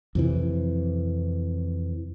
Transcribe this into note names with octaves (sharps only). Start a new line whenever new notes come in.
F2 C3 E3